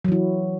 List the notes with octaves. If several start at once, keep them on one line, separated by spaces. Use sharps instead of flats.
E3 F#3 E4